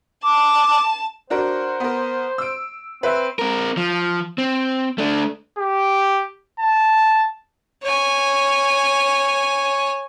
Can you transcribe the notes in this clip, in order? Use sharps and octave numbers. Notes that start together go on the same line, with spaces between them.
A5 D6
D4 F#4 A#4 C5
B3 A#4
E6 D7
C4 B4 E5
C4 A#4
F3
C4
A3 D4
G4
A5
C#5 G#5